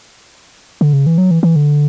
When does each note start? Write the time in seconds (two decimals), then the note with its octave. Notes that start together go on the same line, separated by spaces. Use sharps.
0.81 D3
0.93 C#3
1.07 E3
1.18 F#3
1.31 E3
1.43 E3
1.56 D3